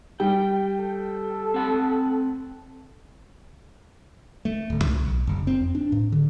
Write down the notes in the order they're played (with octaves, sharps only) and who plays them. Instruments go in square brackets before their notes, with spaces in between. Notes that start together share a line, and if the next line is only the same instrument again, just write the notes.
[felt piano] G3 [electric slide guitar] G5
[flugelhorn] A4
[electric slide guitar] C4 F#5
[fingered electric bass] A3
D1
C#2
B1
F#1
C4
F2
D4
A2
D3